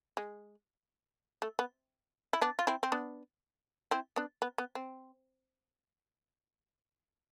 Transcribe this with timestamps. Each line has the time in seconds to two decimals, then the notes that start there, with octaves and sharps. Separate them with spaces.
0.17 G#3
1.42 A3
1.59 B3
2.33 E4
2.41 B3 D4
2.59 F4
2.67 C4 E4
2.83 C4
2.92 B3 D4
3.91 C4 E4
4.16 B3 D4
4.42 B3
4.58 B3
4.75 C4